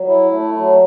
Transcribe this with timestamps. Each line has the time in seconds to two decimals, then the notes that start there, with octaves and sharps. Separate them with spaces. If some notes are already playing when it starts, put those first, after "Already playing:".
Already playing: F#3
0.08 E4
0.32 A3
0.56 F#3